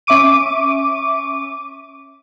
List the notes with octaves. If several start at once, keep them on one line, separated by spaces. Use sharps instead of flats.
C#4 E5 C#6 D6 D#7